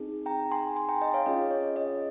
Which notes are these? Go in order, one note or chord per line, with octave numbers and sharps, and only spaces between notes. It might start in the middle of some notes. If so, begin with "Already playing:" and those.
Already playing: C4 D#4 G#4
G5 A#5
G#5 C6
G#5 C6
G5 A#5
D#5 G5
C#5 F5
C#4 F4 G#4 D#5
C#5
D#5